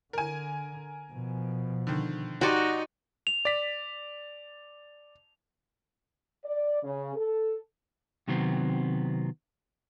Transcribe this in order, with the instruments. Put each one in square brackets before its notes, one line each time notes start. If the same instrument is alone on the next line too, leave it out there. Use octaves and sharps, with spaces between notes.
[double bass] D3 [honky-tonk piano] A#4 G#5
[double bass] B2 F3
[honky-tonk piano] D3 D#3
[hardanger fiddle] D#4 D#5 [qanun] F#4 D5 [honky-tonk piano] G4 F#5 C6
[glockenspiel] F7
[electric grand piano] D5 B6
[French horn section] D5
C#3
A4
[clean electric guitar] C3 D#3 F#3 B3 C4